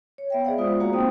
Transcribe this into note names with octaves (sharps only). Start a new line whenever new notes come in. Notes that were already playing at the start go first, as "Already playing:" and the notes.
C#5
B3 E5 G5
G#4 C5 D5 F5 F#5
G#3 B3 F4 D#6
A#3 F#4 C5 F5 F#5 A#5
B3 C4 D#4 G5 D#6